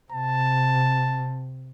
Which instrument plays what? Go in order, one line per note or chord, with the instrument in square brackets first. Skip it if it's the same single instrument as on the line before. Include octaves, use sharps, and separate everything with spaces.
[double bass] C3 [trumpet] A5